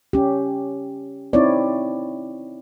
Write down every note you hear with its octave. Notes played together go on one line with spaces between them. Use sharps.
C#4 G4
C4 D#4 E4 C#5 D5